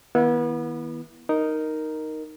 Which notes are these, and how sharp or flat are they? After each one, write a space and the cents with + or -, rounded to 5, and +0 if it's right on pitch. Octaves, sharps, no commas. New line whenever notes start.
D#3 +35 B3 -30 E4 +0
D#4 +0 A#4 +0